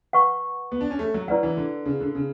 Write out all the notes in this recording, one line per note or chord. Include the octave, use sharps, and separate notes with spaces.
B4 F#5 C#6
B3
D4
C#4
A3
F#3
F#3 E4 B4 D5 F#5
E3
D3
C#3
D3
C#3